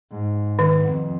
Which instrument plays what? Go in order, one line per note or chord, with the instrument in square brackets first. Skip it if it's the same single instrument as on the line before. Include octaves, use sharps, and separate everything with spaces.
[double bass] G#2
[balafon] D#3
[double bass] F2